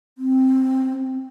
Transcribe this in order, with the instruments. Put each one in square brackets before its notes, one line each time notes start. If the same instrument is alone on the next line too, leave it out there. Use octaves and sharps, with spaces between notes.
[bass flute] C4